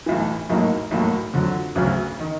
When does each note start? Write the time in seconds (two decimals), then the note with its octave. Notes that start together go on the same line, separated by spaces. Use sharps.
0.06 B1 A2 E3
0.49 B1 A2 F#3 A#3 D#4
0.91 B1 A2 F#3 A#3
1.34 F2 D3 F#3
1.75 D2 C#3 F#3 B3
2.20 D#3